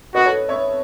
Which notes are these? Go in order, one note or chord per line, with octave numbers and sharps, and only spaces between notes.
F#4 B4 D#5
A4 C#5
C#5 E5